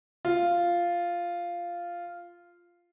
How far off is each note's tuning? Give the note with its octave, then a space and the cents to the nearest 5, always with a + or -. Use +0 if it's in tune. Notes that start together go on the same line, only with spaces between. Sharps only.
F4 -5